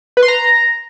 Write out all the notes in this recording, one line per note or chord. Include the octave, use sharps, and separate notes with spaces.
B4
C6
A#5